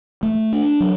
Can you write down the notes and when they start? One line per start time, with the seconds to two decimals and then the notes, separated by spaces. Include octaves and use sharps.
0.23 A3
0.53 D4
0.80 F#3